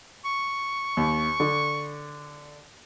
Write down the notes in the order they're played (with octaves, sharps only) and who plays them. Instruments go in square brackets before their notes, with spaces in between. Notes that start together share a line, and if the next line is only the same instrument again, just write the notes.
[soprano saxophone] C#6
[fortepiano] D#2
D3